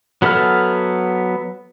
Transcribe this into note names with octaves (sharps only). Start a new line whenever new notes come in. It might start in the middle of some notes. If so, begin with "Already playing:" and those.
F#3 B3 A4 E5 F6